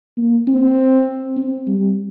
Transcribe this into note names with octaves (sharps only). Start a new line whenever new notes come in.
A#3
C4
C4
G3